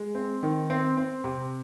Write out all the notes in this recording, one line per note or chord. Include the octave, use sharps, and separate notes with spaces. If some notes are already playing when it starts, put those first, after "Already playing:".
Already playing: G#3
C4
D#3
C4
C4
C3